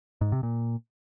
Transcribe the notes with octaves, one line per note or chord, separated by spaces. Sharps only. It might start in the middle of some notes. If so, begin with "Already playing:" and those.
G#2
C3
A#2